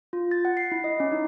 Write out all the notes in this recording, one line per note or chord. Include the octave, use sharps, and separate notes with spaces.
F4
A6
F#5
C7
E4
D#5
C#4
D#4